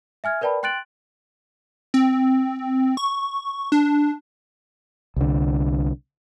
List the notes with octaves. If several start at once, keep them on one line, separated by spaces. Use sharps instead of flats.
E5 G#5 F6 G#6
A#4 B4 D5 G5 A5 B5
G5 C6 F#6 A6 D7 F#7
C4
C#6
D4
C2 D3